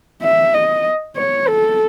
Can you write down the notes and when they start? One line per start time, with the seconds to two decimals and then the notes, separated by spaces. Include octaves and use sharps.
0.23 E5
0.54 D#5
1.16 C#5
1.48 A4